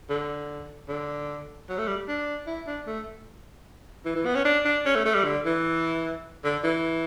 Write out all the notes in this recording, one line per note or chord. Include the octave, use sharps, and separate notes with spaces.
D3
D3
F#3
A3
G3
D4
E4
D4
A3
E3
E3
B3
C#4
D4
D4
C#4
A3
A3
G3
D3
E3
D3
E3